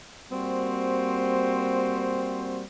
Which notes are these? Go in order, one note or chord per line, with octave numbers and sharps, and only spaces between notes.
G3 A#3 C4 F#4 C5